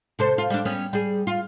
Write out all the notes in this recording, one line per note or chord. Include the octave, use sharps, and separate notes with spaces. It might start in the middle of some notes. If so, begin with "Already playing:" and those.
C3 A4 C5
F4
G3 D4
G3 B3 C#4
G3 G#4
F4